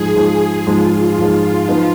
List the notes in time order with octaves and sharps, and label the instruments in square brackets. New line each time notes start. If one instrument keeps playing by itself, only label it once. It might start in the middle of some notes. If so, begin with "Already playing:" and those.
Already playing: [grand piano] G#2 F3 G#3 [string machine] G#4
[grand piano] G#2 F3 G#3
[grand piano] G#2 F3 G#3 [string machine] F4
[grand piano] G#2 F3 G#3
F3 B3 D#4